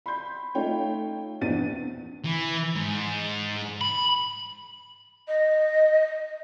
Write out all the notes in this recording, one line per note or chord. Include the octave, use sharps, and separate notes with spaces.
B5 C6 G6
A3 D#4 F4 C#5 G5
A#1 E2 C4 D4 A6 D#7
E3
G#2
B5
D#5